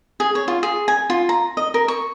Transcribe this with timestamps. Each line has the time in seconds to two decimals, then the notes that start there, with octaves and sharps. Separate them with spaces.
0.20 G#4
0.35 C#5
0.48 F4
0.63 G#4
0.88 G#5
1.10 F4
1.29 A#5
1.57 D#5
1.74 A#4
1.88 C#6